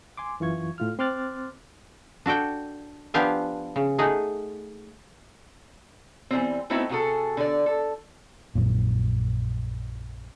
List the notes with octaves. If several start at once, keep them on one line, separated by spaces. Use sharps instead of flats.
G#5 C6 D6
F#2 E3 F4 C#6 G#6
A2 F4 F6
C4 C6 D6 F6 F#6 A6
D4 F#4 A4 G5
F3 B3 D4 G4 F5 G#5
C#3
A3 D#4 G#4 F#5
E3 F#3 G3 C4
A3 B3 C4 D#4 E4 F#4
C3 F#4 G#4 A4
D3 D5
A4
A#1 F#2 A#2